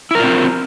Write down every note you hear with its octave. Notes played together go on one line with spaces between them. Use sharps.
C4 E4 F4 A#4